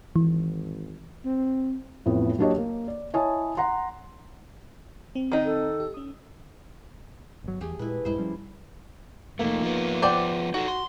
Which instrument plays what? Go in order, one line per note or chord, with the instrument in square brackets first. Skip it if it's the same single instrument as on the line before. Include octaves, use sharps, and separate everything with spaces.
[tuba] G#1 [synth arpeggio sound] E3
[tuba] C4
[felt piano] A1 F2 A2 B3
F#3 A#3 D4 G4 C#5 D#5
A#3
D5
E4 C#5 D#5 G#5 A5 D#6
F#5 A#5 C6
[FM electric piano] C4
[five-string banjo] D#3 D#4
[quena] A4
[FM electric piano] G4
C#4 D#6
[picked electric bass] G1 F#3
[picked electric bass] E2 [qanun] A3 G4 G#4
[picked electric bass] A#2 G#3 [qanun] E4 B4
[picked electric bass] A#1 G2 G#3 [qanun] E4 C5
[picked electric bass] F3 G3 C#4
[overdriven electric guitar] F2 A3 [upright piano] A#3 D#4
[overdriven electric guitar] F3 B3
[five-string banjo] C5 D5 G5 [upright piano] F#5
[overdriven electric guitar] D#4 A4 [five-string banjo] F#4
[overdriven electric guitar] C6